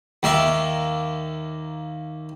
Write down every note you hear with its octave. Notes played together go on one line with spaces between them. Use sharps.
D#2 A#3 E5